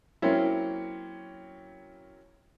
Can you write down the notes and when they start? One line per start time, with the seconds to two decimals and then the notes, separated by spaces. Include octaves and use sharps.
0.22 F#3 A#3 C4 C#4 E4